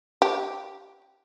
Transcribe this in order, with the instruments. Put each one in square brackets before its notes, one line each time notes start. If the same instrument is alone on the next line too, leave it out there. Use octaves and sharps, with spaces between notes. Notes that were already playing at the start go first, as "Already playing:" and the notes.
[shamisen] G4